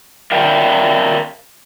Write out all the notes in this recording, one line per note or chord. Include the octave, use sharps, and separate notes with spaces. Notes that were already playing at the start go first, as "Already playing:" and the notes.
A#4 D5 E5 F5 G5